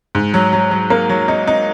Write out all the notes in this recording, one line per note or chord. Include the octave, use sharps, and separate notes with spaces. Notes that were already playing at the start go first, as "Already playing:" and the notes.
G#2
F#3
F#3
F#3
A#3
F#3
D#4
D#4